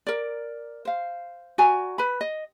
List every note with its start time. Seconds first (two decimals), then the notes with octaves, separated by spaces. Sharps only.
0.07 A#4 D5
0.85 C5 F5
1.58 F#4 D5 G#5 A#5
1.98 B4 B5
2.21 D#5